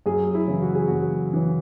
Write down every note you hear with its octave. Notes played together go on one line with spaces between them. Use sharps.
F#2 G#4
E4
C#3 E3
F#4
G#4
F#2 F#4
C#3 E3